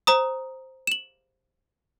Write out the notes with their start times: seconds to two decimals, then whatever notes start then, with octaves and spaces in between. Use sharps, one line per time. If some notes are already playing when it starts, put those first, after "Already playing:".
0.07 C5 A#5 D#6
0.87 E7 F#7